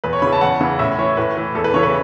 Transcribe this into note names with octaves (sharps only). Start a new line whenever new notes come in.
E2 B4
C#5
C#3 E3 B5
A5
E2 F#5
C#3 E3
A2 E5
E3 C#5
A2 B4
E3
E2 A4
B4
C#3 E3 C#5
B4